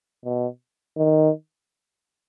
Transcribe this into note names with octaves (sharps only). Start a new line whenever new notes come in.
B2
D#3